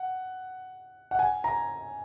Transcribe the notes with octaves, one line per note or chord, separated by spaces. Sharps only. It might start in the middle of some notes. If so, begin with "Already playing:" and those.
Already playing: F#5
F#5
G#5
A#5